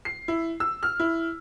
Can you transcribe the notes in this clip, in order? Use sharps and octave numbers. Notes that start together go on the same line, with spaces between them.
C7
E4
E6
F6
E4